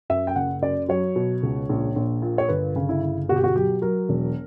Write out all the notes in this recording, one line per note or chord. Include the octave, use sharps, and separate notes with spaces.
F#2 E5
G5
F#1 F#5
F#2 D5
F#3 C#5
B2
C#2
A#1
A#1
A#2
C#5
G1 B4
C#3
E4
G1
B2 F#4
G4
F#4
F#3 G4
F#3 A#4
E1